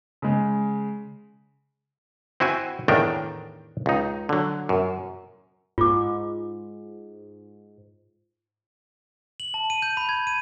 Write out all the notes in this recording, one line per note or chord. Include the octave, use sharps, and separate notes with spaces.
C#3 G#3
C4 E4 F#4 G#5
E2 A2 D#3 D4 A#4 G5
C#2 D#4
D3 F#3
F#2
G#2 F4 D6
F#7
A5
D#7
G6
B5
G#6
D#7